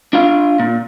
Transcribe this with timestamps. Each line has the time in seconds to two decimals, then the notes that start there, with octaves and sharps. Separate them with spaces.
0.13 D4 F4 F5
0.60 A#2